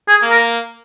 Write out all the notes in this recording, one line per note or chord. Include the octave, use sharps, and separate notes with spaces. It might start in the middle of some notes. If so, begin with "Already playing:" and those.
G#4
A#3
A#4